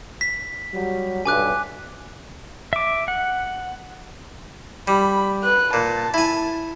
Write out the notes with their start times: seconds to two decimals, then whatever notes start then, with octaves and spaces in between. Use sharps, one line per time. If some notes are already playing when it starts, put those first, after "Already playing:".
0.21 B6
0.74 F#3 G3
1.26 B1 G2 G#5 D6 F#6
2.73 E5 D6
3.08 F#5
4.88 G3 B5
5.43 B4 F#6
5.73 A#2 A5
6.14 E4 G#5